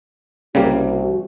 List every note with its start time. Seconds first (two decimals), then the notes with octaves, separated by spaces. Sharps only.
0.55 C2 C#3 G3 A#3 F#4